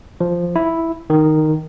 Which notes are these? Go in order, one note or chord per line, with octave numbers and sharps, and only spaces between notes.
F3
E4
D#3